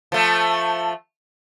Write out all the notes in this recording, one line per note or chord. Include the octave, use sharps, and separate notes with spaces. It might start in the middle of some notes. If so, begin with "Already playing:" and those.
F3 A3